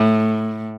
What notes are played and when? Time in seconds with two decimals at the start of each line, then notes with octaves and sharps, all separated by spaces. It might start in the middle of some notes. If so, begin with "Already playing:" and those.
Already playing: A2